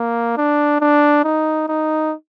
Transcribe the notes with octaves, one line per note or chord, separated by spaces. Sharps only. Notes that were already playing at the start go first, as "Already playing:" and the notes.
Already playing: A#3
D4
D4
D#4
D#4